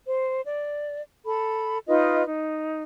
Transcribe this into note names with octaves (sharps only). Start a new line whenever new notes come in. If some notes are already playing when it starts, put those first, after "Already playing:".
C5
D5
A4 B5
D#4 F4 B4 D#5
D#4